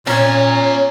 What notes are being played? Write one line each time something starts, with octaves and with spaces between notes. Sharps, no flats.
A#2 C#4 C#5 D5 A#5